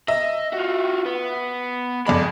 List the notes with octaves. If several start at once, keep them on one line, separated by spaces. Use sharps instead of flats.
D#5 E5 E6
F4 F#4
B3
F2 G#3 D5 B5